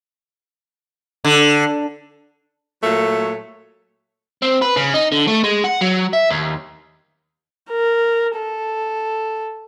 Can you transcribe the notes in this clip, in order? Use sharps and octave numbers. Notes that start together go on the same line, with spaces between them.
D3
A#2 F#3 A3
C4
B4
C#3
D#4
D3
A3
G#3
F#5
F#3
E5
D#2
A#4
A4